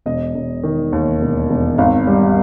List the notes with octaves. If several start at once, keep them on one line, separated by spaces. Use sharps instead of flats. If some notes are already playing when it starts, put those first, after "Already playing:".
E1 D#5
E1
D#3
D#2
E1
E1
G#1 F5
G3